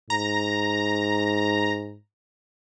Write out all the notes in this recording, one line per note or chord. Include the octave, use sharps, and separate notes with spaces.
G#2 A#5